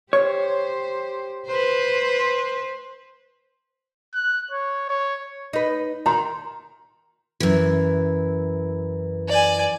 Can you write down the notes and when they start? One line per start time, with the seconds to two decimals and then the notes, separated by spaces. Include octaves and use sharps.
0.13 G4 C5 C#5
1.47 B4 C5
4.14 F#6
4.51 C#5
4.89 C#5
5.53 D#4 B4
6.06 D#3 A#5 C6
7.40 F#2 E3
9.29 D5 G#5